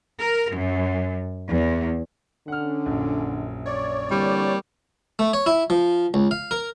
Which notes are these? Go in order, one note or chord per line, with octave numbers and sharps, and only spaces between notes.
A#4
F#2
E2
D3 C#4 F#5 F6
A#1 F#2
C#5 D5
D3 E3 G3 A#3 C4
A3
C#5
E4
F3
C#2
F5
A#4